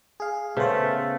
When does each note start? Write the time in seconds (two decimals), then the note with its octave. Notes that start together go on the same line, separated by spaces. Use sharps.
0.20 G#4 F5
0.57 C#3 A3 B3 C5